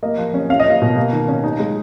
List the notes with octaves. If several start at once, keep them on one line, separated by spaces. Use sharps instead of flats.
A#3 D#5
F3
C#4
C#4 F5
D#5
A#3 F5
B2
A#3
D#3
C#4
D#4
G#3